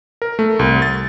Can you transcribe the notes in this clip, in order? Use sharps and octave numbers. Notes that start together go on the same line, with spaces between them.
A#4
A3
C2
A6